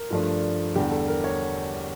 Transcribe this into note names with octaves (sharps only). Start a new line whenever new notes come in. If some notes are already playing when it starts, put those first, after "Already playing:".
Already playing: A#4
G2 F3 A3 D4
E2 D3 G3 G4
A4
A#4
C#5